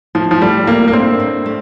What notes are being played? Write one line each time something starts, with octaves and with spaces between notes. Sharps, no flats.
A2 F3
F3
G3 A3
A2 A#3
A#3
C4 D4
A2
A3